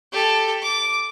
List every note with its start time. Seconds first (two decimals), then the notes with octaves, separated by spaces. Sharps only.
0.12 G4 A4
0.62 D6